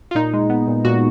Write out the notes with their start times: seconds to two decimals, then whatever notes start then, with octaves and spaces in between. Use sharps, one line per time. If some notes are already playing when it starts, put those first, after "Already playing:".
0.11 F4
0.15 A#2 D#4
0.33 G#3
0.50 B3
0.68 A#2
0.85 A#2 F#4